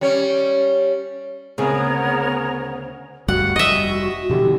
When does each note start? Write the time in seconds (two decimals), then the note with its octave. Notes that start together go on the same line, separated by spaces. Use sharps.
0.01 G3 C#4 C#5
1.58 D2 C#3 B3 C4 G#4 A#4 C#5 A#5
3.28 D2 G2 G3 F#4 F#5
3.56 F1 G3 D#5 E5
4.30 B2 D3 E3 G4